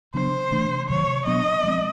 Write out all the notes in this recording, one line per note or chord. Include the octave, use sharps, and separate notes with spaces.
C#3 F#3 B3 D4 C5
C3 E3 A3 D4
C3 D#3 F#3 C#5
B2 F#3 B3 D4 D#5
F3 G#3 C4